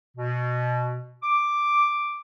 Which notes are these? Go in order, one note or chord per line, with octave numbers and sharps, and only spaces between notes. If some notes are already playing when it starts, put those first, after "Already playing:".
B2
D6